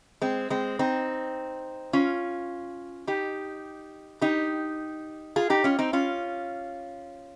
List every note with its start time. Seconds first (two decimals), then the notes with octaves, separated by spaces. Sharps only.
0.22 G#3 C4
0.50 G#3 C4
0.79 C4 D#4
1.93 C#4 F4
3.07 D#4 G4
4.21 D#4 G4
5.36 F4 G#4
5.50 D#4 G4
5.64 C#4 F4
5.79 C4 D#4
5.93 C#4 F4